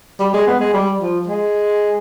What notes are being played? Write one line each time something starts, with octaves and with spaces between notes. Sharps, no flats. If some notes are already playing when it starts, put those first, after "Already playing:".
G3
G#3
B3
G#3
G3
F3
G#3